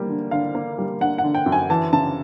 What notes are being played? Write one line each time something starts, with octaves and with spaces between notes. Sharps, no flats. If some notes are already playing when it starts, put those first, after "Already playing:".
Already playing: G3 A#3
D3
D3 F5
A#3
G3
D3 F#5
F#5
D3
G5
F#2
G#5
E3 A5
C#3 A5